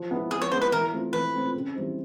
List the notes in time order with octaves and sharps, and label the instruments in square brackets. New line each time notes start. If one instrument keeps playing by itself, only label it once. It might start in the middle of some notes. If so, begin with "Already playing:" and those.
Already playing: [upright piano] F3
G#3 B3 E4
[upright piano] F3 [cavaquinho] G#4
[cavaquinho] C#5
[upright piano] G#3 B3 E4 [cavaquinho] C5
[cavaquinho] B4
[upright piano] E3 [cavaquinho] A#4
[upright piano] A3 C4 F4
[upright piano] E3 [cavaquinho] B4
[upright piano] A3 C4 F4
C#3
E3 G3 C4 D#4